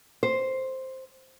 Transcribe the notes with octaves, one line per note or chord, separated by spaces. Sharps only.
C5